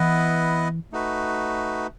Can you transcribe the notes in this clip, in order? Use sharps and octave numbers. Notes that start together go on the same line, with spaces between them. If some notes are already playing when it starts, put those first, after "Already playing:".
Already playing: E3 B3 E4 B4 D#5 F#5
A3 D#4 F#4 B4